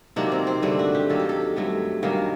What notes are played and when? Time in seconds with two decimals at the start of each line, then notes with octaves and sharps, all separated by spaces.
0.16 C3 D#3 F#3 A#3 D4
0.32 C4
0.47 C4
0.62 G2 D3 A3 D4
0.79 F#4
0.95 G4
1.09 G2 D#3 F#3 A#3 A4
1.19 G4
1.29 A4
1.56 G2 F#3 A3
2.03 G2 D#3 F#3 A#3